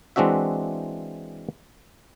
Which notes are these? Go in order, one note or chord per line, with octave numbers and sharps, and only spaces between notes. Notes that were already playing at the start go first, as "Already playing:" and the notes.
E3 G#3 C4 D4 F#4 E5